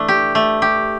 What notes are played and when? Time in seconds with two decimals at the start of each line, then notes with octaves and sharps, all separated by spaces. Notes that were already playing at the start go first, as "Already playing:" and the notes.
Already playing: E3 A3 D4
0.08 G4
0.35 A3
0.62 G4